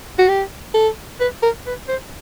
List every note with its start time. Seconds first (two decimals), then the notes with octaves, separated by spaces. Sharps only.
0.19 F#4
0.28 G4
0.74 A4
1.20 B4
1.42 A#4
1.66 B4
1.88 C5